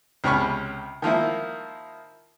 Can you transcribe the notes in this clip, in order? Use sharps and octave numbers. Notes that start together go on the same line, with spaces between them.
C#2 C3 C#4 B5 C#6 F6
D#3 F3 A#3 E4